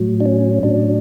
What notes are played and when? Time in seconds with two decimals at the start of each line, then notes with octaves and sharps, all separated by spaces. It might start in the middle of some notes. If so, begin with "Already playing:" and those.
Already playing: A2 F#3
0.20 D4
0.25 C#4
0.63 A2 F#3 D4